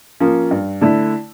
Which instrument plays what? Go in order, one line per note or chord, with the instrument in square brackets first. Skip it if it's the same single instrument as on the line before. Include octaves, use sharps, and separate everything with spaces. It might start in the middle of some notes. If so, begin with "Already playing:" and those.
[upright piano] F3 A#3 C#4
G2
D3 A3 E4